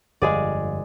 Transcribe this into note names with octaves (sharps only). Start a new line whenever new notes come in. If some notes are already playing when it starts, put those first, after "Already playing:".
G1 F2 G#3 G#4 D5